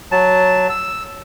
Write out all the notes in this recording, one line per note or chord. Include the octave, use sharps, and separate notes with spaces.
F#3 A5
E6